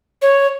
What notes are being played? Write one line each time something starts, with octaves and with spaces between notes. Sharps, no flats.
C#5